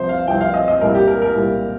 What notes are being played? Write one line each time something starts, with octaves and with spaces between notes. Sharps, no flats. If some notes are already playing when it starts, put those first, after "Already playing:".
Already playing: C2 C3 F3 C5
F5
C2 C3 F3 G5
F5
D#5
D#5
C2 A#2 G3 A#4
G4
A#4
A#4
C2 A#2 G3